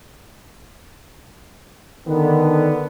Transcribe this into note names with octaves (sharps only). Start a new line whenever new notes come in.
D3 D#3 B3